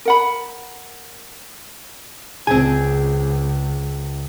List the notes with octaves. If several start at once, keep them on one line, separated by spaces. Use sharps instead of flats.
A#4 F#5 B5
C#2 C4 G#4 G#5